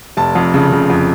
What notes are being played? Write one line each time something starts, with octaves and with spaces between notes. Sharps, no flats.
F1 A5
F2
C#3
C#3
F2